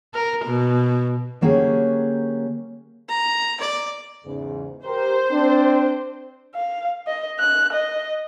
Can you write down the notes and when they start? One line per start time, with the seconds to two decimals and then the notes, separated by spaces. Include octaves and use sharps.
0.14 A#4
0.45 B2
1.41 D3 F#3 A#3 C#4 G4 G#4
3.09 A#5
3.60 D5
4.25 E2 G#2 C#3
4.85 G4 A#4 C5
5.32 C4 D4
6.55 F5
7.07 D#5
7.39 F#6
7.73 D#5